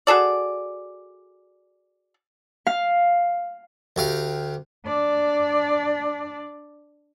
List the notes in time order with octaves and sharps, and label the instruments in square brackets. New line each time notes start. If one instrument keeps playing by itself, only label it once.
[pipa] F#4 G#4 A4 D5
[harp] F5
[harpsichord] D2 G4 F5
[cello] D4 D5